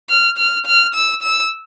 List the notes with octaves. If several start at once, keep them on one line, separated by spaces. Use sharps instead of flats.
F6
F6
F6
E6
E6